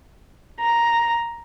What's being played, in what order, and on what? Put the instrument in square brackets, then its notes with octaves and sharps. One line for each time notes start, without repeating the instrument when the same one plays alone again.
[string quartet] A#5